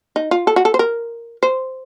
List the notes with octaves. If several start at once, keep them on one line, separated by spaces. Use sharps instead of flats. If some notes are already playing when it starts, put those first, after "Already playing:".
D#4
F4
A4
F#4
A4
C5
A#4
C5